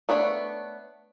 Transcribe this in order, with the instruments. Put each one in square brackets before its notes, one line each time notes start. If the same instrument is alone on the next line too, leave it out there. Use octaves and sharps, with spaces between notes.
[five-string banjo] A3 B3 D4 C#5